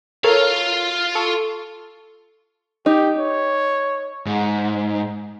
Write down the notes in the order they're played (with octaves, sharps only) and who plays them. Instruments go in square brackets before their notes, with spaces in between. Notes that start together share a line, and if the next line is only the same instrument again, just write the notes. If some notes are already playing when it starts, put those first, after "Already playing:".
[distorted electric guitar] F4 F5 [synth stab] A4 A#4 C#5
[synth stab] A4 C#6
[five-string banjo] D#4 [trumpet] G4
[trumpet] C#5
[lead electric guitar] G#2